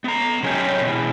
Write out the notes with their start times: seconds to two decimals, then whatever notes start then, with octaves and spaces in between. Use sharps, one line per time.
0.04 B3 A#5
0.43 C#3 F#3 G#3 C#4 D#4 G4
0.82 B2 E3